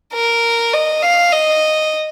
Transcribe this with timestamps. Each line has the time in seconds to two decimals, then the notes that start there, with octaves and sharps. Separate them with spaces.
0.13 A#4
0.73 D#5
1.02 F5
1.32 D#5